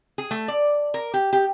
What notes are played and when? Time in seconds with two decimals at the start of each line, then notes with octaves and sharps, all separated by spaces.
0.18 G#4
0.31 A3
0.48 D5
0.94 A#4
1.14 G4
1.33 G4